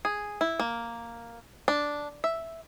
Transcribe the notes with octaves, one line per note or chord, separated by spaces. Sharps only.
G#4
E4
A#3
D4
E5